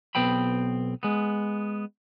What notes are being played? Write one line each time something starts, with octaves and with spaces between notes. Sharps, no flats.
B1 B3 C4 G5 B5
G#3 B3